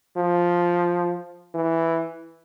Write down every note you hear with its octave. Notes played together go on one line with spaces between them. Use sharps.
F3
E3